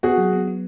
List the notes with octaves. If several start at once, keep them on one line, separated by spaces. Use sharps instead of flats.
B3 F#4 G#4
F#3
B3
B3